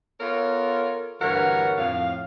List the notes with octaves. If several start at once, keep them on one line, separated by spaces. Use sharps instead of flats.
B3 F4 A4 A#4 C#5
D2 G2 E3 A#4 C#5 F#5
F2 A2 F5